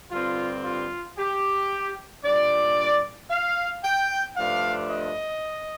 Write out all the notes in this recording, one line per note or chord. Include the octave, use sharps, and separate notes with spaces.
G2 D3 G3 C4 F4
F4
G4
A#2 G3 D4 D5
F5
G5
G2 F3 A3 D4 F5
D#5